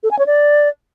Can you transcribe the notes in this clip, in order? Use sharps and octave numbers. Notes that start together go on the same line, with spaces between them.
A4
G#5
C#5
D5